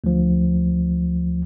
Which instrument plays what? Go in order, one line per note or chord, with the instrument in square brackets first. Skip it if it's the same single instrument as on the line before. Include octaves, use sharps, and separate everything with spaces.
[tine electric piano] D2 F3